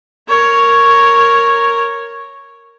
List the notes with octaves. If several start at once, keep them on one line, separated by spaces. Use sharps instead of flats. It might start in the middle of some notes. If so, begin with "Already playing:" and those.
A#4 C#5